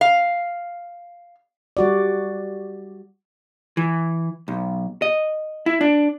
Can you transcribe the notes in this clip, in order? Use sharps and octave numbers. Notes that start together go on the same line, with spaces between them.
F5
G3 F#4 D5
E3
B1
D#5
E4
D4